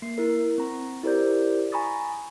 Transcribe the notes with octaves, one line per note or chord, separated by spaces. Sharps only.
A#3 C7
E4 A#4
C4 A#5
E4 G4 A#4 C5 D5 G6
G#5 A#5 B5 C#6 D#6 A6